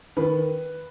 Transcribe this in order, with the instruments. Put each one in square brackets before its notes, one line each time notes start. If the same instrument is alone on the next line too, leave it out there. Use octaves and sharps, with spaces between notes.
[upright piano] D#3 B4